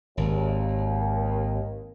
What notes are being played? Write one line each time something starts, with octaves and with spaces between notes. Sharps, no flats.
G#1 D#2